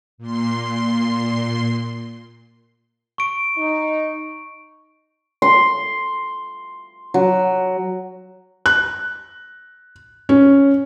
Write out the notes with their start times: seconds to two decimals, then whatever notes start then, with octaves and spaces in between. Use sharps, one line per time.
0.18 A#2 C6
3.18 C#6 D7
3.58 D#4
5.42 C6
7.14 F#3
8.66 F#6
10.29 C#4